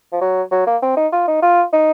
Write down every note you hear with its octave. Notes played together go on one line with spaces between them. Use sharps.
F3
F#3
F#3
A#3
C4
D#4
F4
D#4
F4
D#4